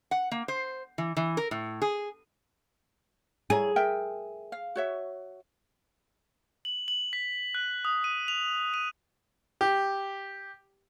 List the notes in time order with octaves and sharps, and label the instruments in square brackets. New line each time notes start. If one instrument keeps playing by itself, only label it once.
[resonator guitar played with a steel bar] F#5
A#3
C5
E3
E3
A#4
A2
G#4
[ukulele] E4 C#5 A#5 [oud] G#4
[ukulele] A#4 E5 G5
F5
F#4 C#5 E5
[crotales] F#7
F#7
B6
F#6
D#6
D#7
F7
D#7
[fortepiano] G4